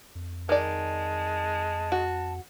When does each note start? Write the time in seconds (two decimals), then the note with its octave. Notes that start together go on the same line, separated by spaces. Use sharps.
0.15 F2
0.49 D#3 G#3 D5 A5
1.92 F#4